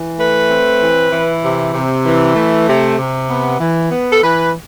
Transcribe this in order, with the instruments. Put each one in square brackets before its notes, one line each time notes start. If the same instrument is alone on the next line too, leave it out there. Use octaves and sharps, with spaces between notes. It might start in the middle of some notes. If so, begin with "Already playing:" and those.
Already playing: [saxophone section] E3
A3 B4
C4
E3
E3
C3
C3
E3
A3
C3
C3
B3
E3
B3
A4
E3 B4